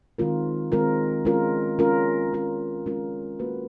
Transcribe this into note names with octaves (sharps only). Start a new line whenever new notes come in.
D#3 G#3 C4 F4 A#4
D#3 G#3 C4 F4 A#4
G#3 C#4 F4 A#4
G#3 C#4 F4 A#4
G#3 C#4 F4 A#4
G#3 C#4 F4 A#4
A#3 C#4 F#4 B4